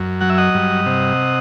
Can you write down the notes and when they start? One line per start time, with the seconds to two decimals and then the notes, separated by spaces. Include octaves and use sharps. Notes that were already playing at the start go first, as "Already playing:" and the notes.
Already playing: F#2
0.21 F#3 F#5
0.30 E5
0.38 D#5 F#5
0.54 G2
0.86 C3